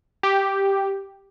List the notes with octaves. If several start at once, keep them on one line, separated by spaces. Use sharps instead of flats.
G4